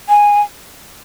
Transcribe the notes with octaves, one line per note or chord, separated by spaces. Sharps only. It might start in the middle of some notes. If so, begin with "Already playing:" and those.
G#5